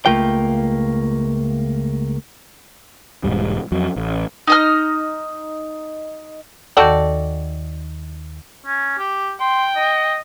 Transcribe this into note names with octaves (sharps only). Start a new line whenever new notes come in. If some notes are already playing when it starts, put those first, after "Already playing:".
C#2 A3 A#3 F4 G5
E1 D#2 G#2 G3
F2 F#3
A1
D#4 D#5 F6
D#2 D#3 F#4 A4 D5
C#4
G4
G5 C6
D#5